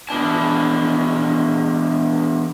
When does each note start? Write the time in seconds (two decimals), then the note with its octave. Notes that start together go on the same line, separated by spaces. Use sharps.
0.09 E3 B3 D4 A5